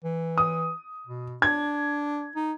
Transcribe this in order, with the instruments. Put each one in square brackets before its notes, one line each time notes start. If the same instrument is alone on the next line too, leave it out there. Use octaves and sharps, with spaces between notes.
[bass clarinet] E3
[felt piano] D#6
[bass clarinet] B2
[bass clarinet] D4 [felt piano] G#6
[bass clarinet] D#4